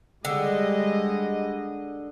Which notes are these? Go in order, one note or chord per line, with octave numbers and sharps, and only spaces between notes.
D3 G3 G#3 D#5